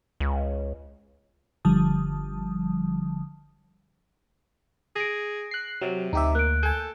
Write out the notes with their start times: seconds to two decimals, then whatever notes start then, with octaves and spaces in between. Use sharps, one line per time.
0.20 C#2
1.65 G1 D3 F3 G3 A5 D#6
4.96 G#4 A#6 D7
5.51 F#6 C7
5.82 C3 F#3
6.13 D2 D#4 G4 E5 A#5 D6
6.35 A#3 F#6 D7
6.63 A4 G#5 G6